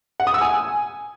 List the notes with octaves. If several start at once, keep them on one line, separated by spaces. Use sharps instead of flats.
F#5
D#6
E6
G#5